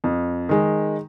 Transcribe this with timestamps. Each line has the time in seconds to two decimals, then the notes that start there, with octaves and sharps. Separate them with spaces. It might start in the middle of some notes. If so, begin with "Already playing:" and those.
0.04 F2
0.49 D#3 G#3